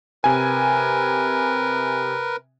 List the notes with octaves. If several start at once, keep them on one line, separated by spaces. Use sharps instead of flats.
C3 A#4 B4 G#5